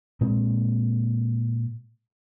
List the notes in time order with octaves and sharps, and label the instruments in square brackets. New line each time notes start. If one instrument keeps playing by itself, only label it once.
[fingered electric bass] A#2 G#3 C4